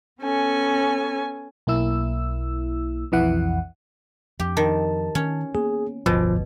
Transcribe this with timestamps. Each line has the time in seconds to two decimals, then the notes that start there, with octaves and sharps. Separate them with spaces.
0.22 B3 C#4 A4 G#5
1.67 B1 A#3 E4 E6
3.12 B1 F2 E3 E4 F#5
4.40 F2 G4
4.57 D#3 A5
5.15 D#3 C#4
5.55 A#3 B3 G#4
6.06 D1 G1 B2 F3